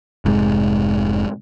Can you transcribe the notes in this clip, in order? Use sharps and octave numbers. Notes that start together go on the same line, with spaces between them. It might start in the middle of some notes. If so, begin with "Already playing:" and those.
F1 G#2 C3 G#3